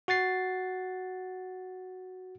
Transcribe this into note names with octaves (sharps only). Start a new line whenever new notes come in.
F#4 F#5 A6 C7